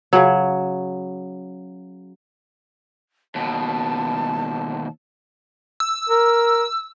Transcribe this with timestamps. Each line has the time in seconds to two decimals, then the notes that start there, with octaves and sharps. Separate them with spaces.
0.13 C#3 F#3
3.35 D#2 B2 A5
5.80 E6
6.09 A#4